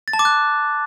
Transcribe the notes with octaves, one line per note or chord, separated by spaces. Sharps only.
A6
A5
D6
F#6